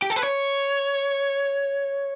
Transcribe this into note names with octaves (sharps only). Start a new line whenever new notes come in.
G4
A4
B4
C#5